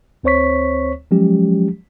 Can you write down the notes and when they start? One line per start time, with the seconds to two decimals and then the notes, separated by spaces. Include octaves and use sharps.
0.23 D2 C4 C5 C#5 C#6 B6
1.11 F3 F#3 G#3 C#4 G4